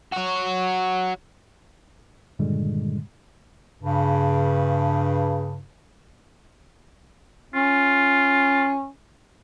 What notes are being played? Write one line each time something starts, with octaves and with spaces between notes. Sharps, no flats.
F#4 C#5
G2 A#2 D3 D#3 G3 G#3
G2 C#3
C#4 F4